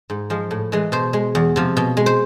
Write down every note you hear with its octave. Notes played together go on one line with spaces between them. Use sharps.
G#2
F3 G#3
A2
E3 G#3
B2 C5
G#3
E2
C3 F3
B2
G#3
C5